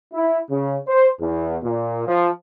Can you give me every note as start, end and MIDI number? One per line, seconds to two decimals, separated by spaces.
0.13 0.39 64
0.49 0.77 49
0.87 1.09 72
1.20 1.57 40
1.63 2.02 46
2.06 2.28 53